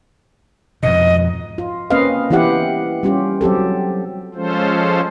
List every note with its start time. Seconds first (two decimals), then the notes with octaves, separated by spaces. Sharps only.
0.83 F2 G#2 B2 D#5
1.58 F4
1.90 A#3 C4 C#4 B4 D#5 F5
2.30 E3 B3 E4 G4 F#5
3.03 G3 C#4 F4 G4
3.41 F#3 C4 G4 A4
4.34 F3 G#3 C#4 F4 A4 C5